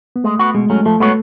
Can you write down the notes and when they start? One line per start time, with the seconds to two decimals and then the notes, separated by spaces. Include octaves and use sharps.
0.16 B3
0.24 G#3 A3
0.39 B3 F#4
0.55 B2 G#3
0.70 F#3 A3 C#4
0.85 F3 A3
1.00 G#3 A3 B3 F#4 C#5